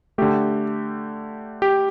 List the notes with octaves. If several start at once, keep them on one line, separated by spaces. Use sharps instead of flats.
D3 A3 G4
G4